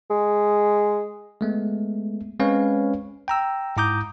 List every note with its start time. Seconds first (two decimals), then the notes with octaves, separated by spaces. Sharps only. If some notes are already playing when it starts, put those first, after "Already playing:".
0.10 G#3
1.41 G#3 A3 B3
2.39 G#3 C4 C#4 B4 C#5 F5
3.28 G5 A#5 E6
3.77 G#2 E4 A#5 D6 D#6 G6